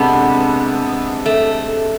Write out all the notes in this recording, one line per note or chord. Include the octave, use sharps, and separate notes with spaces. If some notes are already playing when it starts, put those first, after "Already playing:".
Already playing: C3 G#3 B3 D4 A4
A3